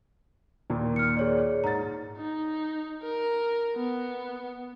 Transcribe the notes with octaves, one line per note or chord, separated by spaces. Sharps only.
D#2 A#2
F6 C#7
G#4 C#5 D5
G#2 A#5 A6
D#4
A#4
B3